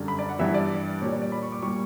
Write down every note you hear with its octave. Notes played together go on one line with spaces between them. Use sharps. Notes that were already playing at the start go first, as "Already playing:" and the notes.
Already playing: F#2 D3 G3
B5
D5
F#5
G2 E3 G3 E5
D5
A#2 G3 C#5
D5
D5
B5
C#6
D6
A#2 G3 C#6